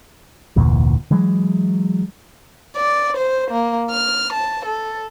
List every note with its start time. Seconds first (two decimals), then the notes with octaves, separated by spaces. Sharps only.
0.56 F1 D2 A#2 E3
1.11 E3 F#3 G#3
2.77 D5
3.17 C5
3.51 A#3
3.91 F6
4.33 A5
4.65 A4